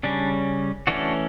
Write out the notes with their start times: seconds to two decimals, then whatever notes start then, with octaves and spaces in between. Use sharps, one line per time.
0.03 C#3 G3 C#4 D4
0.87 E3 A3 C#4 D4 F#4